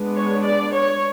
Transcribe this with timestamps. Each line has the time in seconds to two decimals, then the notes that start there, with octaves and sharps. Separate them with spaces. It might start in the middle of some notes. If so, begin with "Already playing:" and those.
Already playing: G#3 B3 D4
0.16 C#5
0.45 D5
0.75 C#5